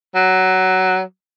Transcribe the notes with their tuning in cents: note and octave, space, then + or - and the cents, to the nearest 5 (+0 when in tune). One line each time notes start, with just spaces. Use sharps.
F#3 +15